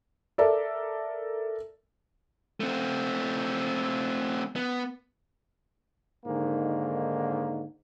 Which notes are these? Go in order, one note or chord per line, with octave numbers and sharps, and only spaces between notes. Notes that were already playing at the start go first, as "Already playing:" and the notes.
A4 A#4 D5 E5 A5
A3 C4
B3
G#2 D3 D#3 A#3